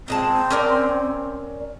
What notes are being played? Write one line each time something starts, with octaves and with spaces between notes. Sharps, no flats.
A#2 G#3 C4 A5
C#4 A#4 D5